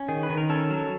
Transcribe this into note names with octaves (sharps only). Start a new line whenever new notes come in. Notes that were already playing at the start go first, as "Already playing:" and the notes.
Already playing: C#4
D#3 G#4
B4
D#3
A#4
C#4 A4
F#3